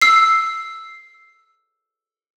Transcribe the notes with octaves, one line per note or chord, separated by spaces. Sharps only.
E6 C7